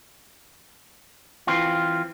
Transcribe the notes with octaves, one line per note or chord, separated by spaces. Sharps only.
E3 C4 F4